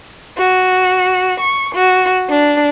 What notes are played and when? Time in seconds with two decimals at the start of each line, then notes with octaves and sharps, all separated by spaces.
0.37 F#4
1.40 C#6
1.74 F#4
2.29 D4